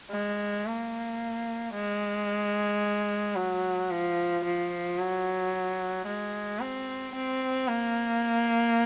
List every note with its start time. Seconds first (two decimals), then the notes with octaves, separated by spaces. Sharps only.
0.11 G#3
0.66 A#3
1.74 G#3
3.36 F#3
3.90 F3
4.44 F3
4.99 F#3
6.07 G#3
6.60 C4
7.15 C4
7.68 A#3